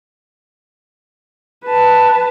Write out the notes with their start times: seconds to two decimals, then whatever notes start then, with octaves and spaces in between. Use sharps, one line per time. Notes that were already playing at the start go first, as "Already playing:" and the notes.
1.65 B4 A5